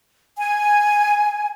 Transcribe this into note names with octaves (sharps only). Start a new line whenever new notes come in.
G#5